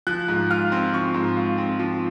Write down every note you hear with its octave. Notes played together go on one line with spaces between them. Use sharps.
F3 F#6
G#2
F4 F6
C4
F3 C#6
G#2
F4
C4
F3